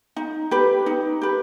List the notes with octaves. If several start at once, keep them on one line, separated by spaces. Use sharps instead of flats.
D#4
G4 B4
D#4
G4 B4